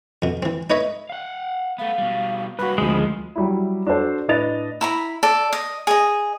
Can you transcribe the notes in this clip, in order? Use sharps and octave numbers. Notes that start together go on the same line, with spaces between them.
F2 B2
E3 C4
D#4 B4 C#5 D#5 E5
F5 F#5
A3 B3 F5
B2 G3
G2 A#3 F#4 B4 B5
D2 C3 D#3 F3 G#3 G#4
F#3 G3 E4
D4 F#4 A4 C5
A2 D4 B4 D#5 A6 F7
E4 A#5 B5
A4 D5
D#5
G#4 D#5